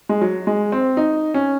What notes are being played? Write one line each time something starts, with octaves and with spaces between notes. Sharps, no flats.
G#3
F#3
G#3
C4
D#4
C#4